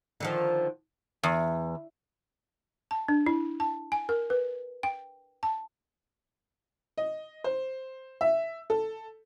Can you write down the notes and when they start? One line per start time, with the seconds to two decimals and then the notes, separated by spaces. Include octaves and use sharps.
0.20 D3 D#3 F3
1.23 E2
2.91 A5
3.08 D4
3.26 E4
3.60 A5
3.92 G#5
4.09 A#4
4.30 B4
4.83 G5
5.43 A5
6.98 D#5
7.44 C5
8.21 E5
8.70 A4